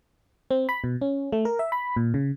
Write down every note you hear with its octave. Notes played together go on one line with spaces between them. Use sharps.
C4
B5
B2
C#4
A3
A#4
E5
B5
A#2
C#3